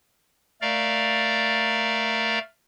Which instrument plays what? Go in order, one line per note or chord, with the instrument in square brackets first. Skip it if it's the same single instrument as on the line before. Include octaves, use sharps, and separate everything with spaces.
[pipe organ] A3 A#4 D5 F5 A#5